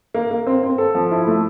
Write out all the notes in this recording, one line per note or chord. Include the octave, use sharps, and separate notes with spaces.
A#3
A#3
C4
C4
A4
F3
E4
A3